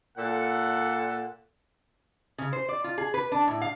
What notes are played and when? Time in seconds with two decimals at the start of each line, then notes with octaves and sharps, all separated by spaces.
0.18 A#2 A4 F#5
2.38 C#3
2.53 C5
2.69 D5
2.84 F4
2.98 G#4
3.14 B4
3.32 D4
3.47 A2
3.61 F5